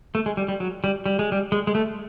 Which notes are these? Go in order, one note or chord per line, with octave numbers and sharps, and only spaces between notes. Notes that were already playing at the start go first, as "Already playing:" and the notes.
A3
G#3
G3
G3
F#3
G3
G3
G#3
G3
G#3
G#3
A3